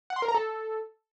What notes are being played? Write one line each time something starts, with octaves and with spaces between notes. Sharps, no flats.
F#5
C6
A#4
A#5
A4